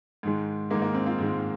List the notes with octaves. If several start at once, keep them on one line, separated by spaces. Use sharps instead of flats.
G#2 D#3 G#3
G#2 D#3 G#3 A#3 D#4
A#3
C4
C4 F4
G#2 D#3 G#3